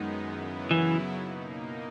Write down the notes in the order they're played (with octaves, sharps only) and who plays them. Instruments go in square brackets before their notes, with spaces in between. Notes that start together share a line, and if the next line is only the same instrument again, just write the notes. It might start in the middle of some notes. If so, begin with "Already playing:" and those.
Already playing: [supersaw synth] F#2 D#3 G#3 B3 D#4
F#2 C#3 F#3 B3 E4
[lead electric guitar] E3
[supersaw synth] B2 A#3 D#4